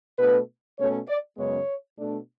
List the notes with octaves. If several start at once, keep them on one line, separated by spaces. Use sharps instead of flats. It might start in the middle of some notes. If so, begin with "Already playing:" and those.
B2 A3 D4 B4
B2 A3 C#4 C#5
D5
F#2 C#3 G#3 B3 C#5
B2 A3 D4